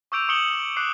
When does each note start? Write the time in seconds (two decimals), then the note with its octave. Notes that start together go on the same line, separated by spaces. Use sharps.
0.12 C#6 D6 E6 G6 D7 F7
0.29 C#6 D#6 C#7 E7 F#7 G7
0.77 D6 F#6 C7